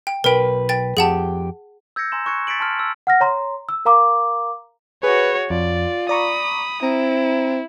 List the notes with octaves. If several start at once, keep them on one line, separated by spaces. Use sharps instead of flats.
G5
B1 A#4 B4 G5
G5 A6
F2 G4 G#4 F#5 A5
E6 G6 G#6 A#6 C#7
G#5 A#5 C6 E7
C#6 F#6 G#6 C#7
A6 B6 C#7 D7 F#7
A5 C6 C#6 F6
E6
F#5 F6 A#6
C#5 A#5 C6
E6
A#4 F5 A#5 D6
F#4 G#4 B4 C#5
F2 F4 D5
D5 A#5 B5 C#6 D#6
C4 E4 A#5